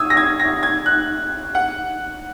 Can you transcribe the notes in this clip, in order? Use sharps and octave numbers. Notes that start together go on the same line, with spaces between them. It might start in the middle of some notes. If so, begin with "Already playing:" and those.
Already playing: D#6 E6 G#6
A#6
G#6
A#6
G#6
F#6
F#5